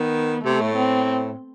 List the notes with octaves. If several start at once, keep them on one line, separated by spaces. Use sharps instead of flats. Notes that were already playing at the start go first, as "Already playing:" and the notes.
Already playing: D#3 B3
C3 A3
A2
C4